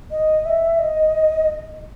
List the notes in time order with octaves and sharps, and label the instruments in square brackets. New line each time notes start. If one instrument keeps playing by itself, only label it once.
[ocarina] D#5
E5
D#5